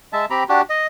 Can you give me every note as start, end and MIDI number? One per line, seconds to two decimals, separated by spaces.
0.13 0.25 56
0.13 0.25 76
0.13 0.25 81
0.30 0.44 60
0.30 0.44 67
0.30 0.44 82
0.30 0.44 83
0.49 0.61 62
0.49 0.61 66
0.49 0.61 67
0.70 0.87 75